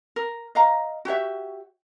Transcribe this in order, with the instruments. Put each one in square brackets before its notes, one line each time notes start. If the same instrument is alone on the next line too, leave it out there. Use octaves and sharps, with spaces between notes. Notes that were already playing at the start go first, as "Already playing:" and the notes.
[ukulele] A#4
D#5 F5 A#5
F#4 G4 C#5 E5